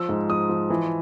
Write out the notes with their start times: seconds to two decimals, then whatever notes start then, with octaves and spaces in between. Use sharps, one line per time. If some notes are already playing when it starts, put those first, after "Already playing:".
Already playing: F3 E6
0.09 G#2
0.29 F3 D#6
0.49 F3
0.70 E3